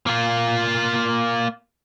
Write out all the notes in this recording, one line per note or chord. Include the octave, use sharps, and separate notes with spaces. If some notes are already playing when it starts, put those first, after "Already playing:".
A#3 F4